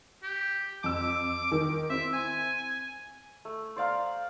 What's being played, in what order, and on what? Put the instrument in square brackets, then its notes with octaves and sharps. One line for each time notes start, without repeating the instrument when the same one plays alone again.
[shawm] G4
[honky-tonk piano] F2 E6 [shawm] D6
[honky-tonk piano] D#3
[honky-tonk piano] C4 E4 [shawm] E5
[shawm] G#5
[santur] A3
C5 D5 F5 A#5